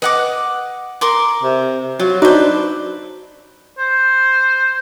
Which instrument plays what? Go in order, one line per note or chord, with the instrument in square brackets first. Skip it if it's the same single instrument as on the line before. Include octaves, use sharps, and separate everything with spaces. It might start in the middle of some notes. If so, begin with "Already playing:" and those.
[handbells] B4 [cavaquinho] D#5 F#5 D6
[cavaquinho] A#4 C6 D6
[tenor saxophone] C3
[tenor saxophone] F#3 [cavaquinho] F4
[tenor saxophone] D4 [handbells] D#4 F#4 D#5 [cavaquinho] B4 C5
[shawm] C5